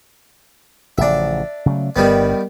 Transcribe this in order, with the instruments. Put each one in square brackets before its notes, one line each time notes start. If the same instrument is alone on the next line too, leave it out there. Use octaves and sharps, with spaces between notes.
[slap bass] A1 C#3 F3 [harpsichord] D4 E5
[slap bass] C#3 F#3 A3
[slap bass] G1 G2 [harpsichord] D#3 G3 B3